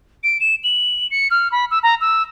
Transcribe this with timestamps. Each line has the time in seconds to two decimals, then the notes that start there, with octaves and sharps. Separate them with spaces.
0.23 D7
0.40 E7
0.64 F#7
1.11 C#7
1.31 F6
1.52 B5
1.71 E6
1.83 A#5
2.01 E6